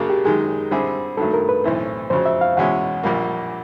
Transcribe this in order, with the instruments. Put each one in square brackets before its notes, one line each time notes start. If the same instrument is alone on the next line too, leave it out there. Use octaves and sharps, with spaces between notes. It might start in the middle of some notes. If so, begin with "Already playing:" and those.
Already playing: [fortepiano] F#2 C#3 F#3 A#3 D4 [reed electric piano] G#4
[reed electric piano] G4
[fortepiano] F#2 D#3 G#3 [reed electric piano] G#4
[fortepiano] D3 G3 C4 E4 G#4
[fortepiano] G2 D#3 F#3 A3 [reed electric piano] A4
[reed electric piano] A#4
B4
[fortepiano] B1 A2 E3 A3 C4
[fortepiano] F2 C#3 F#3 [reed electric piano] C5
[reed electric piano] E5
F5
[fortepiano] E2 B2 G#3 C#4 E4 [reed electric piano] F#5
[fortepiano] A#1 A#2 G3 A#3